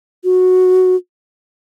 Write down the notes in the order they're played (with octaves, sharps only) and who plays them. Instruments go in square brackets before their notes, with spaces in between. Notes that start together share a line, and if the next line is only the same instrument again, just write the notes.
[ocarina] F#4